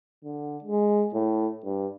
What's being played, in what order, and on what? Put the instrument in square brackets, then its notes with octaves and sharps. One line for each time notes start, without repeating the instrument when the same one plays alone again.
[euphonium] D3
G#3
A2
G2